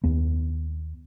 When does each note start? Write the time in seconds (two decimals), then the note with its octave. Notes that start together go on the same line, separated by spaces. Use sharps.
0.04 D#2 B3